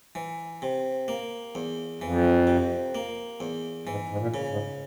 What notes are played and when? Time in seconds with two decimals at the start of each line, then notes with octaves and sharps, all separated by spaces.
0.15 E3
0.62 C3
1.08 A#3
1.55 E2
2.01 F2 E3
2.47 C3
2.95 A#3
3.40 E2
3.87 G#2 E3
4.09 G#2
4.18 A#2
4.34 C#3
4.48 G#2